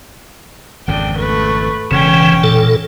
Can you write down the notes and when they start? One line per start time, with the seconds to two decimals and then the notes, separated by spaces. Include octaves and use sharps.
0.88 G#1 F2 C#3 D4 G5
1.19 A3 B4
1.91 E1 C#3 E3 C#4 G5
2.43 A#2 A4